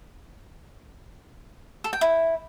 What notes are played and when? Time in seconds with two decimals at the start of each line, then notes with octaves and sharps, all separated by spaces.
1.84 A4
1.93 G5
2.01 E4